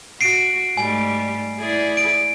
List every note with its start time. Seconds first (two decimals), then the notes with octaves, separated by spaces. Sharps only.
0.21 F#4 C7 D7
0.77 G#2 G3 A3 G#5
1.59 E4 G#4 D5
1.97 D7